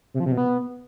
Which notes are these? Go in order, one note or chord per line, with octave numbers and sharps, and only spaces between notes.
C3
F3
C3
B2
B3